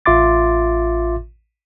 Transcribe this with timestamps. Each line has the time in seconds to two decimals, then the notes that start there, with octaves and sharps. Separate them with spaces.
0.06 A1 F4 E5 C6 D6 A6